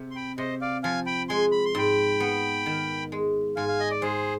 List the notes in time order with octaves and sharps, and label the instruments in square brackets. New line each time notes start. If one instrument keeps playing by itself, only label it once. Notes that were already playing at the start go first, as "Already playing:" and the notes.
Already playing: [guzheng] C3
[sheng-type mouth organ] C6
G5 B5
[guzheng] C3 [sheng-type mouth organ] C5 D#5
[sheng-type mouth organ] D5 F5
[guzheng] F3 [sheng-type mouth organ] F5 G#5
[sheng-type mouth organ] G5 B5
[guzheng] G#3 [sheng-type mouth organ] G#5 C6
[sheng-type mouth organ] B5
C6
[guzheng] G#2 [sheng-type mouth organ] G5 B5
[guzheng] B3
D#3
G#3
[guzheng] G#2 [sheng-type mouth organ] F5 G#5
[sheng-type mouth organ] F5
D#5
D5
[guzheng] G#2 [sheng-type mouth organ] G#4 C5